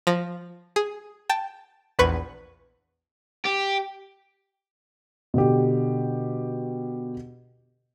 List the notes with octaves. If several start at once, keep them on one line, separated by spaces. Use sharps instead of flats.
F3 A#6
G#4
G5 A5
A#1 E2 B4 B5 C#6
G4
B2 D3 G4